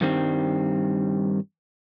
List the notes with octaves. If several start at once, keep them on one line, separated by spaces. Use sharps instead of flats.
G2 D#3 G3 C4